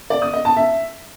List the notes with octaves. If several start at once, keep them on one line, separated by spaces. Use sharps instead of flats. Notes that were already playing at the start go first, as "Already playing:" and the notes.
D5
D#6
D#5
A5
E5